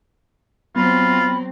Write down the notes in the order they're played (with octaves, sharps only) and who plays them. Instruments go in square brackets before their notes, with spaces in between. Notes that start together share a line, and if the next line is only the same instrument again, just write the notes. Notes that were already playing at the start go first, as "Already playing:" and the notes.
[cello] F#3 C4 [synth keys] B3 [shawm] F4 [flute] B5